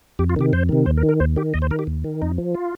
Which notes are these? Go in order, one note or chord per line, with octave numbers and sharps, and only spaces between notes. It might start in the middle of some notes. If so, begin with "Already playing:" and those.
F2 G4
F4
C3 D#3 G4
F2 C5
C3 D#3
D#2 C5
A#4
D#3
A#4
D#2 C5
D#3 G4
D#2 D#5
C5
D#3 A#4
G4
D#2
D#3
F2 D#4
F3
F4